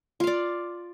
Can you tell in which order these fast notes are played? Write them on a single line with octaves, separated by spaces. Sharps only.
F4 F5 D5